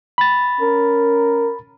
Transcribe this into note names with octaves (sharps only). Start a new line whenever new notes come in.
B5 A6
C#4 A#4